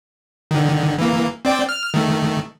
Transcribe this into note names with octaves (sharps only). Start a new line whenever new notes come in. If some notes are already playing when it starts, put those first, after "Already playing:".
D3 D#3
E3 A#3
C4 D5 G5
F6
D#3 A3